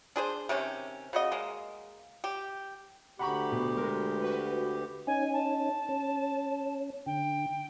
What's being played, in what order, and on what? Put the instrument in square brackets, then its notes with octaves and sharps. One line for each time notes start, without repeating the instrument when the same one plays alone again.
[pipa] D4 G#4 C5
C3 D#3 C#4
C#3 F#4 D#5
G#3 A#3
G4
[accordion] D2 G4 [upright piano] F#5 A#5 C#6 [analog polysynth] B5
[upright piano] B2
[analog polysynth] G#3 [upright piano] A#4
[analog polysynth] F#4 B4
[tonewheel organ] C#4 D#4 [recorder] G#5
[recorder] A5
[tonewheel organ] C#4
[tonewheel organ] D3 [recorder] G5